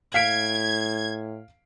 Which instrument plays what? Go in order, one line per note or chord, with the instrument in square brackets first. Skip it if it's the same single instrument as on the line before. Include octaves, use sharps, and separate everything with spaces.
[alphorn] A2 [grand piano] F5 B6 D7 [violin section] G#6